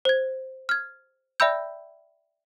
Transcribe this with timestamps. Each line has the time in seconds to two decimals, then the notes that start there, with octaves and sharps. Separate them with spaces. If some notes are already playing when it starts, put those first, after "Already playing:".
0.05 C5 G#6
0.69 F6 G#6
1.40 D5 E5 G5 B5 E6 G6